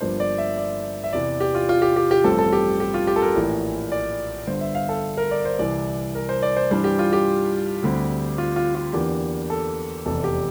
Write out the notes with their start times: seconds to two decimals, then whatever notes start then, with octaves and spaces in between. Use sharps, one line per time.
0.01 G1 G2 F3 A#3 D4 C5
0.20 D5
0.38 E5
0.58 D5
1.04 E5
1.12 E2 C3 E3 D5
1.41 G4
1.55 F4
1.69 F4
1.82 G4
1.96 G4
2.11 G4
2.24 A1 G2 F3 C4 A4
2.39 A4
2.53 G4
2.80 G4
2.94 F4
3.07 G4
3.16 A4
3.22 A#4
3.35 A#1 A2 E3
3.92 D5
4.47 G1 G2 D3 C5
4.61 E5
4.75 F5
4.89 A4
5.17 A#4
5.31 D5
5.45 C5
5.59 C2 C3 E3 D5
6.15 A#4
6.29 C5
6.42 D5
6.57 C5
6.71 G2 E3 G3 D4 C5
6.84 G4
6.99 F4
7.13 G4
7.82 D2 D3 G3 C4
8.38 F4
8.56 F4
8.75 F4
8.93 E2 E3 A#3 D4 G4
9.50 A4
10.06 F1 E2 C3 A4
10.24 G4